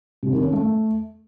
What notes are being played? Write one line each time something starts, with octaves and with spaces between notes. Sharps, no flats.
C3
D#3
C#4
A3